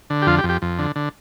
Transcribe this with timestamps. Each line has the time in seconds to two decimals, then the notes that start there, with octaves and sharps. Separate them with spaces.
0.10 D3
0.22 G4
0.27 F2 F4
0.38 G4
0.43 F2
0.49 G4
0.62 F2
0.79 D3
0.96 D3